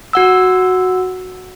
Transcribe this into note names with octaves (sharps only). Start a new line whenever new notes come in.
F#4 F#5 E6